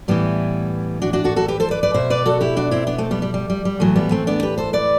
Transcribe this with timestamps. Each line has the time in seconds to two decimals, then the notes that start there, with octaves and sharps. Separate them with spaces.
0.08 A2 E3 G3 B3
1.02 D4 F#4
1.13 D4 F#4
1.24 F#4 A4
1.36 F#4 A4
1.48 G4 B4
1.60 A4 C5
1.71 B4 D5
1.83 B4 D5
1.94 B2 C5 E5
2.10 B4 D5
2.26 F#4 A4
2.41 E4 G4
2.57 D4 F#4
2.71 C4 E4
2.87 B3 D4
2.98 A3 C4
3.11 G3 B3
3.22 G3
3.34 G3
3.50 G3
3.65 G3
3.80 A2 E3 F#3 A3
3.96 G3 B3
4.11 A3 C4
4.27 B3 D4
4.43 G4 B4
4.58 A4 C5
4.73 B4 D5